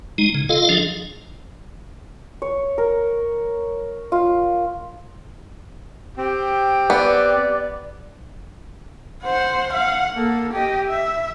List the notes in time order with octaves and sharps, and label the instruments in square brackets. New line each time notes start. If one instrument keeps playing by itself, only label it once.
[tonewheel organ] G#3 D#4
C#3
F4 A4 D#5 F5
F3 D4 G#4 D#5
[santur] C#5
A#4
F4
[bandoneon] C4 [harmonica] G4
[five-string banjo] B3 [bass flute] D5
[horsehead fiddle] C5 F#5
F5 F#5
A#3 A4
G4 D#5
E5